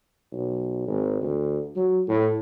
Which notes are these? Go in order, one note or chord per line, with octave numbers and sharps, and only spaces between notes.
B1
G#1
D2
F#3
A2